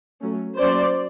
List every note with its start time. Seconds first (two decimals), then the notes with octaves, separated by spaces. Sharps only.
0.21 F#3 A3 C#4
0.58 F#3 A#3 C#4 C5 D5